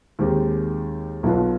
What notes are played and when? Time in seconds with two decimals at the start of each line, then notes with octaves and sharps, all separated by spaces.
0.19 D#2 D#3 G#3 C4 G4
1.23 B1 B2 B3 F4